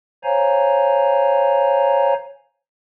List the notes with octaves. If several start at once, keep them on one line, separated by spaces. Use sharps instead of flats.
C5 C#5 F5 G#5 A#5